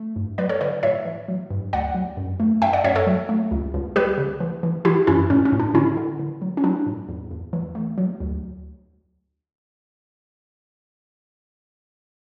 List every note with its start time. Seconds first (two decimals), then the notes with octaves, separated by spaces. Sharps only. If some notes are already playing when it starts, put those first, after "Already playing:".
Already playing: A3
0.16 G2
0.38 F#3 B4 D5
0.49 A4 C#5
0.61 D3 B4 D5
0.83 A2 C#5 E5
1.05 E3
1.28 F#3
1.50 G2
1.73 D2 D5 F#5
1.95 F#3
2.17 F#2
2.40 A3
2.62 F#2 E5 G5
2.73 D5 F#5
2.84 F#2 C#5 E5
2.95 A4 C#5
3.07 F#3
3.29 A3
3.51 C#2
3.74 C#2
3.96 G3 G4 B4
4.18 C#3
4.40 E3
4.63 E3
4.85 E3 E4 G4
5.07 F#2 C#4 E4
5.30 A2 C#4
5.45 C#4
5.52 A2
5.60 D4
5.74 D3 C#4 E4
5.97 D3
6.19 D3
6.42 F#3
6.57 C#4
6.64 F#3 D4
6.86 A2
7.08 E2
7.31 E2
7.53 E3
7.75 A3
7.98 F#3
8.20 D2